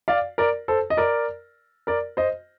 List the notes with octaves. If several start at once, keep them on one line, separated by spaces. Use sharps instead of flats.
D5 F5
A#4 D5
A4 C5
D#5
A#4 D5
A#4 D5
C5 D#5